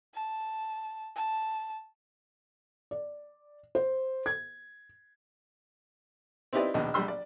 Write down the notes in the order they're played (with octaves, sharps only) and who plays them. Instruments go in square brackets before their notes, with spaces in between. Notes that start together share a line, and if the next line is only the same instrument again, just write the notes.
[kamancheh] A5
A5
[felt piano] D5
C5
G#6
[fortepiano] C4 D#4 E4 G4 B4 D5
A#1 D#2 B2
A#1 G3 C6 E6
D5